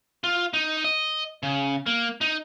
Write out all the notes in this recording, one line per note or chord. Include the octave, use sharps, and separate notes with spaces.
F4
D#4
D#5
C#3
A#3
D#4